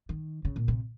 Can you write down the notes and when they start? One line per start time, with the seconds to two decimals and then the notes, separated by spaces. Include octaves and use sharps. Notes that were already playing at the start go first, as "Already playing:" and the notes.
0.09 D#3
0.45 C#3
0.56 A#2
0.68 C3